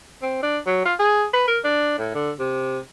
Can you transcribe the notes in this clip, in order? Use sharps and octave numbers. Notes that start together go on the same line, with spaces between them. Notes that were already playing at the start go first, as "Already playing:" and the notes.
C4
D4
F#3
F4
G#4
B4
A#4
D4
A2
D3
C3